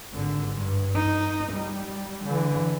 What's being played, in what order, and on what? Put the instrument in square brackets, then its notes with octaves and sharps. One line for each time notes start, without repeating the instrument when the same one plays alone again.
[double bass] G#1 D3
G2
D#4
G3
D3 E3